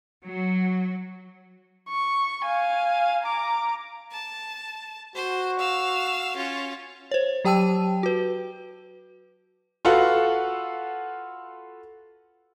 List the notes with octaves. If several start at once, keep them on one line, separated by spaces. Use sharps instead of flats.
F#3
C#6
F5 G#5
A#5 D6
A5
F#4 C5
F5 E6
C#4 F4
C5 C#5
F#3 G4 G5 A5 E6 D#7
F#4 B4
F4 F#4 A4 B4 F5 F#5